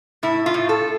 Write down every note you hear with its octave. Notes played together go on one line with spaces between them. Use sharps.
A2 E4
F4
A2
A4